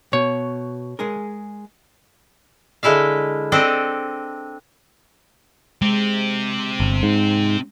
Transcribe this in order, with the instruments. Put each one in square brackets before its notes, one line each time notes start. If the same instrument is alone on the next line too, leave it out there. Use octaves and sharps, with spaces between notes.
[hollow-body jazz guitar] B2 [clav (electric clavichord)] C#5
[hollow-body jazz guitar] G#3 G#4 A#4
[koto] D3 G#3 E4 E5 F5
C4 D4 A4 D#5
[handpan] G#3 [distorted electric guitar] C4 G4
[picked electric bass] G1
G#2